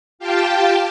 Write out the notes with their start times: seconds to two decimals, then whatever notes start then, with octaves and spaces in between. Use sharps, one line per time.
0.19 F4 G4 F5 G5 A5